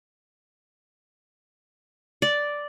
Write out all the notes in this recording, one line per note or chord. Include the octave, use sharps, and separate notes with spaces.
D5